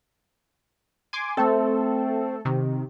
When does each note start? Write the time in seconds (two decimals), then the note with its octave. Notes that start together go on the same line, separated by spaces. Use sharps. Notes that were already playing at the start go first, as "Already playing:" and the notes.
1.13 G#5 C6 D6
1.37 A3 C4 A4
2.45 C3 D#3